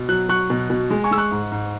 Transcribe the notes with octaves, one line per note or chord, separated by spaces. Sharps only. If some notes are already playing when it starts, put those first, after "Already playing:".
Already playing: B2
F#3 F#6
F#3 C#6 F#6
B2
B2
G#3
G#5 C#6
G#3 E6
C#6 F#6
G#2
G#2